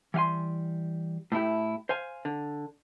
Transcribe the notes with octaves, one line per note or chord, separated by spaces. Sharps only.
E3 G3 F5 G#5 C6
A2 A3 E4 G4
C5 F5 G#5
D3